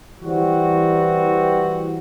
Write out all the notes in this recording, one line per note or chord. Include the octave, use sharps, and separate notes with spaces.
E3 G3 C4 F#4